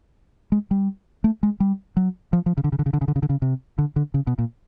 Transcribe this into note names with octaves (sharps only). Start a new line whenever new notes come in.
G#3
G3
A3
G#3
G3
F#3
F3
F3
C#3
D3
C#3
D3
C#3
D3
C#3
D3
C#3
D3
C#3
C3
D3
D3
C#3
B2
A#2